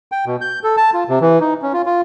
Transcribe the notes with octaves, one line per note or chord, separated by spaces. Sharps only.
G5
B2
G6
A4
A5
F4
C3
E3
D#4
C#4
F4
F4